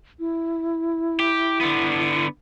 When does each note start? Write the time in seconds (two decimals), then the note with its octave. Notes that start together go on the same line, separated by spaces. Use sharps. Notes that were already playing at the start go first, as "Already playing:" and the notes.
0.19 E4
1.20 G4
1.61 D3 B3